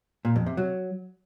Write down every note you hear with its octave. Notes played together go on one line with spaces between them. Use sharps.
A#2
F2
C3
F#3